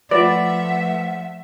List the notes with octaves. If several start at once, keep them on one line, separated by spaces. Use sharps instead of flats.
F3 A3 F4 B4 D5 E5 F#5